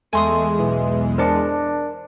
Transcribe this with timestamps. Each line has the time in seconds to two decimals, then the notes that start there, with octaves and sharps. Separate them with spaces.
0.13 E2 G#3 A3 G#5 C6 D#6
0.59 B1 E3
1.18 D4 A#4 C5 A5